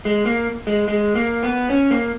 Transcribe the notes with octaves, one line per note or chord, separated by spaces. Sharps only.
G#3
A#3
G#3
G#3
A#3
B3
C#4
A#3